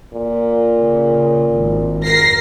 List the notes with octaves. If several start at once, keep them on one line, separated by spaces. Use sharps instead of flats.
A#2
C#3
G#1
A#4 A#6 C7